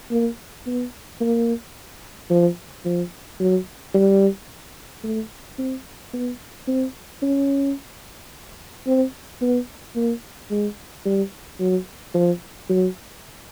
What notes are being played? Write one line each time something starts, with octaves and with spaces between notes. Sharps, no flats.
A#3
B3
A#3
F3
F3
F#3
G3
A3
C4
B3
C4
C#4
C4
B3
A#3
G#3
G3
F#3
F3
F#3